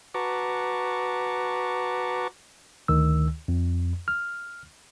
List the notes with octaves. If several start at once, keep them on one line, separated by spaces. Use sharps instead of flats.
F#4 B4 A5 A#5 C#6 D6
D2 D#3 E6
F2
F6